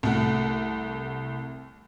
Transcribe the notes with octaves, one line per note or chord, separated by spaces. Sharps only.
C2 A3 F#5